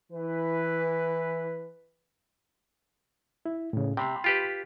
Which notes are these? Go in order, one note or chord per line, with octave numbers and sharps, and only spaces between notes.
E3 B4
E4
A2 C#3
C3 G5 B5 C6
F4 G4 B4